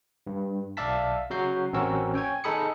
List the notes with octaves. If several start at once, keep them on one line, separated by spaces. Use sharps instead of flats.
G2
B1 D5 E5 F5 A5 B6
C#3 F#3 F#4 G6 C7
A1 C4 C#4 F#4 A#4 E6
C#5 G5 G#5 G#6
D#4 G#4 A4 B5 D#6 C#7